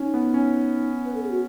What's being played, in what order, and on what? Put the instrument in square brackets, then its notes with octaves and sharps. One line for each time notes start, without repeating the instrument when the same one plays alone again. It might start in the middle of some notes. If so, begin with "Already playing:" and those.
Already playing: [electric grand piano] C#4 [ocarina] D#4
[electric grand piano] B3
C#4
[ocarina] B4
A4
G#4
F#4